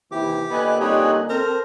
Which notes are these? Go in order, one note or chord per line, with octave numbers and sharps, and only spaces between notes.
D#2 C3 E3 G4 D6
A#2 D3 A#3 B3 D#5 G#5 F#6
G3 C4 D#4 C#5
C4 A4 A#4 C5